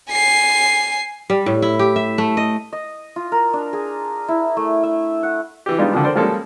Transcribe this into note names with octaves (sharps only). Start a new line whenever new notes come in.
G#5 C7
G3
A2
E4
G4
E5
A3
D#5
D#5
F4
A#4
D4
G#4
E4
A3
E5
F#5
E3 G4
G3 G#3 B3 D4 D#4 F4
D3 D#3 F3 D4
A4 A#4 C5 D5
F3 G3 G#3 A#3 C#4 A4